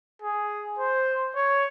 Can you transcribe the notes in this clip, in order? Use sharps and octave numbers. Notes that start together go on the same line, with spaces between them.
G#4
C5
C#5